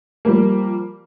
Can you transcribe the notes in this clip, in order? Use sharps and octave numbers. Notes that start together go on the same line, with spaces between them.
F3 G3 A#3